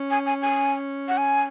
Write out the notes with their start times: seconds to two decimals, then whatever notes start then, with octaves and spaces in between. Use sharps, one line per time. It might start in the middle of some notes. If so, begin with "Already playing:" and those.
Already playing: C#4
0.11 G#5
0.26 G#5
0.42 G#5
1.08 F#5
1.17 G#5